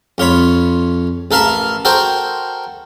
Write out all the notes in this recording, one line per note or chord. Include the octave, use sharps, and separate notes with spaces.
F2 F4 C#5 B5
A1 A4 A#4 F5 A5 B5
F#4 A4 A#4 C5 G5